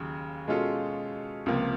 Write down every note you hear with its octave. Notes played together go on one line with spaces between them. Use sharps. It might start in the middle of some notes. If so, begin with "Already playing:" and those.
Already playing: D#2 C#3 F#3
B2 G#3 C#4 F4 A4
C#2 C3 F3 A#3